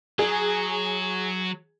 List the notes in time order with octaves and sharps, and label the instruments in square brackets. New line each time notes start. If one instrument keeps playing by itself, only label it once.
[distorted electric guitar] F#3 [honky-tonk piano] G#4